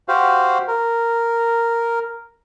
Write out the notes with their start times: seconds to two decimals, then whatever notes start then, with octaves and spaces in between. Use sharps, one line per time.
0.08 F#4 G4 C5 F5
0.68 A#4